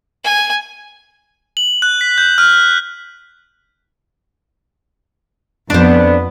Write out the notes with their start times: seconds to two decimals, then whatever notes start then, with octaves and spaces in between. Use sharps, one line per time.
0.24 G#5
1.57 F#7
1.82 F#6
2.01 B6
2.18 G6
2.38 F6
5.70 F2 B3 D4 C5